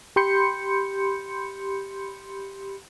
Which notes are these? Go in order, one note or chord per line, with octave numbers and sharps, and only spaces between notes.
G4 B5 C6 G6 C#7